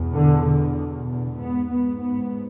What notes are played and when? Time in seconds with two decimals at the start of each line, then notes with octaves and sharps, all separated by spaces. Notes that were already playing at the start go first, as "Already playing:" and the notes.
Already playing: E2 B2
0.13 D3
0.43 D3
1.05 D3
1.37 G#2 B3
1.69 B3
2.00 B3